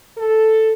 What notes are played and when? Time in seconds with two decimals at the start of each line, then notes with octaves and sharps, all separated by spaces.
0.18 A4